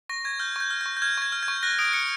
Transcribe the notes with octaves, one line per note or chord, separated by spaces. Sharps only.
C#6 A#6
C#6 G#6
F6 G6
C#6 G6
F6
C#6 G6
G6
F6 G#6
C#6 G#6
F6
G#6
C#6
F#6 A#6
D#6 D7
F#6 C#7